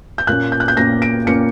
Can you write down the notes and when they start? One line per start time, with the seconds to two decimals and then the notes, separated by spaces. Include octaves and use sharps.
0.18 G6
0.27 A#2 A#3 C#4 F#6
0.52 G6
0.60 F#6
0.68 G6
0.77 A#2 A#3 C#4 A#6
1.02 D7
1.26 A#2 A#3 C#4 C#7